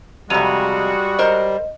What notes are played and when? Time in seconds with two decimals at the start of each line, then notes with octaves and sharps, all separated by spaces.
0.30 F2 C3 G3 G#3 F#4 D#7 F7
1.19 A#4 C5 D#5